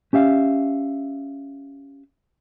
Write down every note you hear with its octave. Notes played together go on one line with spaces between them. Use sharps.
C#4 G4 E5 F5